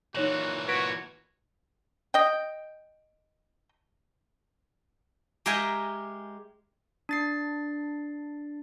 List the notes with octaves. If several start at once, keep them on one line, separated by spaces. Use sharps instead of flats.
A#2 E3 D#4 F#4 C#5 F#7
F#4 B4 C#5 B6 D7
D#5 G5
G#3 G4 A#4 E5 G5 G#5
D4 A6 C7